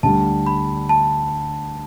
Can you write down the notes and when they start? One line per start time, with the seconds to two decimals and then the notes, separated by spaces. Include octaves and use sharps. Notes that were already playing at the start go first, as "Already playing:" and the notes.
0.03 D2 D3 G3 A5
0.46 B5
0.89 A5